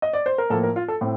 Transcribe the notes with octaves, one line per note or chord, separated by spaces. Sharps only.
D#5
D5
C5
A#4
A2 F3 A#3 A4
A#4
F4
A4
A2 C4